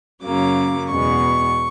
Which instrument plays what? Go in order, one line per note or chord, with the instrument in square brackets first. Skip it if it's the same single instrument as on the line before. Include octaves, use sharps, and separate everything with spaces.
[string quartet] F#2 C#3 F#3 A#3 D6
E2 B2 G#3 B3 C#6